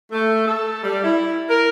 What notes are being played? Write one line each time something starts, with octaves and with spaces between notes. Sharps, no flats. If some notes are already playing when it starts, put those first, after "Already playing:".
A3
A4
G3
E4
A#4